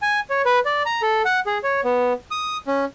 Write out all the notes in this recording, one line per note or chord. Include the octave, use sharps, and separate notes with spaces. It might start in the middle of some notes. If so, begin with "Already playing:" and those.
G#5
C#5
B4
D5
A#5
A4
F#5
G#4
C#5
B3
D#6
C#4